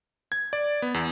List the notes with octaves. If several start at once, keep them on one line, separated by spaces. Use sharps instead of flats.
G#6
D5
B3
E2